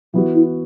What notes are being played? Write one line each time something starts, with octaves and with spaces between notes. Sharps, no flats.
E3 F#3 B3 F#4
E4